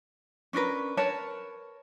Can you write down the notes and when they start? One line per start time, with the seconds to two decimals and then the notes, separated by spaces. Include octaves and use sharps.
0.53 C#4 D4 A#4 B4
0.97 A#4 B4 C#5 A5